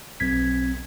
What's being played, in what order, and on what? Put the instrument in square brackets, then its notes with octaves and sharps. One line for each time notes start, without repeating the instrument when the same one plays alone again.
[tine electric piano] B1 G#6 B6 [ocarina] C4